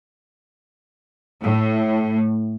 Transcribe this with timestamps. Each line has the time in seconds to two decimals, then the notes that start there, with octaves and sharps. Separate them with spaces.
1.42 A2